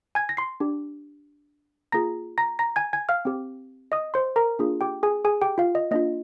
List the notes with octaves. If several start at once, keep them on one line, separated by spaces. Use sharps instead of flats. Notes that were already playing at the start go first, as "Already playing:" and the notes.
G#5 G#6
A#6
C6 C7
D4 G4
A#3 F4 G#4 A#5 A#6
A#5 A#6
A#5 A#6
G#5 G#6
G#5 G#6
F5 F6
C4 G4
D#5 D#6
C5 C6
A#4 A#5
A#3 D4 F4 G#4
G4 G5
G#4 G#5
G#4 G#5
G4 G5
F4 F5
D#5
A#3 D4 F4 D#5